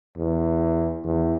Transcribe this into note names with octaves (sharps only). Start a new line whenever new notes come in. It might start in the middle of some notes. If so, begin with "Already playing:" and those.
E2
E2